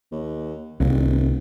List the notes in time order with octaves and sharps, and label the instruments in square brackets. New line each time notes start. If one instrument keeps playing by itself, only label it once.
[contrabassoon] D#2
[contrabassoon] D#1 [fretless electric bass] C2